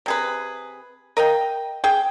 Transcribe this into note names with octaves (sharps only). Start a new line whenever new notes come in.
C3 G#4 B4
A#4 D#5 F5 G5
G#4 G5